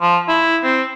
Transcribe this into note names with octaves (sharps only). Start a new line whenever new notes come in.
F3
E4
C4